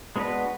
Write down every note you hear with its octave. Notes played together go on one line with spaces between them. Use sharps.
G#3 B3 D4 F#4 B4